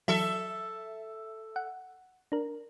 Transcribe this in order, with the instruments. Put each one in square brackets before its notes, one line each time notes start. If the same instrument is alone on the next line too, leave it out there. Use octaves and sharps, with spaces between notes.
[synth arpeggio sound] E3 F#3 [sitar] A4 E5
[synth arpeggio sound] F#5
D4 A#4